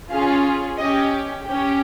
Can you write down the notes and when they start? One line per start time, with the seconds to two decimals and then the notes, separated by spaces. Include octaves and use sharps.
0.10 C#4 F4 G#4 F5
0.77 C#4 G4 D#5
1.44 C#4 G4